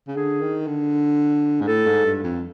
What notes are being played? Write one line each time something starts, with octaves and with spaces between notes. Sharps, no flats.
C#3
D3 G#4
D#3
D3
G#2
A2 A4
G#2
G2
F2